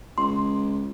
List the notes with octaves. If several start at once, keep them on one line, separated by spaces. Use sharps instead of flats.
C#2 C6